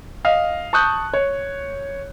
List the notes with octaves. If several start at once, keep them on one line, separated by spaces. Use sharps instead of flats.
D#5 F5
A5 C#6 D#6 F#6 G6
C#5